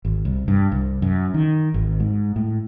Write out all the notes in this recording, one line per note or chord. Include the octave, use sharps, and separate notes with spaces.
G#1
C2
G2
C2
F#2
D#3
G#1
G#2
A2